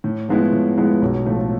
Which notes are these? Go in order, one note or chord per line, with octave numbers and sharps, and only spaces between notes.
A2
F3 G#3 B3 E4
A2
F3 G#3 B3 E4
B1
A2 F3 A3